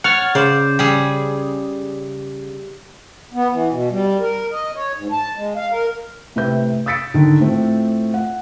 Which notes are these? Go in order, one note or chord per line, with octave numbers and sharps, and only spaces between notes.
C#5 F#5 F6 A6
C#3 C5 D5
G3 G#4
B3
E3
B2
G3
A#4
D#5
C#5
G#2
A5
G#3
F5
A#4
A2 C3 C4 B4 E5 G6
D#6 E6 A6 B6 C#7 D7
D3 D#3
A2 C4 F4
F#5